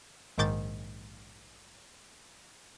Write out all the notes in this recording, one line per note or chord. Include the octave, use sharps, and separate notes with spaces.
A#1 G#2 D#3 D6 G6 A6